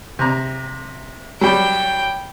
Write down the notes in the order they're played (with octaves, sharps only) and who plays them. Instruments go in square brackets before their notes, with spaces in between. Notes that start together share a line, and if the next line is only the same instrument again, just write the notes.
[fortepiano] C3 A#5
[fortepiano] F#3 G3 [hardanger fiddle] G5